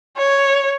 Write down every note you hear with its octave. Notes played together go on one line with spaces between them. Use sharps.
C#5